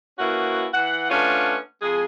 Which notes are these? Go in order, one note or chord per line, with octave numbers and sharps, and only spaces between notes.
A#3 B3 C#4 E4 F#4
E3 F#5
A3 B3 C#4 D4 F4
F2 G#3 G#4